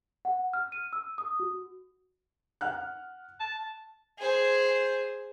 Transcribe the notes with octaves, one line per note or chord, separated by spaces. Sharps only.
F#5
F6
D#7
E6
D#6
F#4
F#5 F6 F#6
A5
G#4 C5